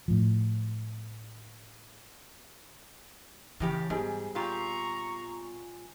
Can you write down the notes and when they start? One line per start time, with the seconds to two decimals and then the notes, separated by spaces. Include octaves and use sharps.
0.08 A2 F3
3.60 A2 C#3 E3 G4
3.90 G#2 G3 B3 G#4
4.35 A#2 F4 G4 A#5 C#6